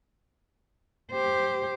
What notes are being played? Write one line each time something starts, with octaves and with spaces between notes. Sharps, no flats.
G4 C5